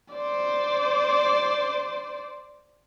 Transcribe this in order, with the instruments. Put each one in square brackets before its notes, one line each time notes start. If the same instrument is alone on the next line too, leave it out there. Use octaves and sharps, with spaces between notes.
[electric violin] C5 D5